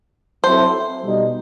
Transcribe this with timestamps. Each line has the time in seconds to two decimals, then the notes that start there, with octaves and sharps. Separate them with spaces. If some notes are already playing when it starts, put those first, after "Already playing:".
0.44 F#3 C4 E4 A4 C5
1.05 B2 G3 D#4